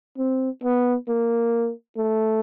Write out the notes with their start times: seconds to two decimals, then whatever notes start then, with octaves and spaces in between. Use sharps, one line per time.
0.18 C4
0.64 B3
1.08 A#3
1.97 A3